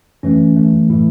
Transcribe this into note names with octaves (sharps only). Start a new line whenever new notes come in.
F#2 E3 A3 C#4
F#2 E3 A3
A2 E3 A3 E4